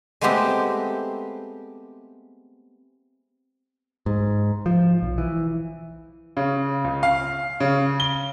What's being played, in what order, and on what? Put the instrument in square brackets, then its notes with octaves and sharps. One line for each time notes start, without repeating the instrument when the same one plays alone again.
[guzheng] G#3 A3 B3 C4 G4
[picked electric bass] G#2
F3
B1
E3
[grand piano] C#3
C#2
F5
C#3
G7